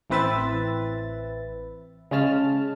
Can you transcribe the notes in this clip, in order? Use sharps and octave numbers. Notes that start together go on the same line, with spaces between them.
A1 E3 C4 B4 E5 A6
C#3 G#3 C#4 A5 F6